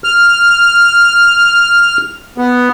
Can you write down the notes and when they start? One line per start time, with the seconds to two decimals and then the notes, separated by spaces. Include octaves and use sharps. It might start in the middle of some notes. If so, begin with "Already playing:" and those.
0.04 F6
2.38 B3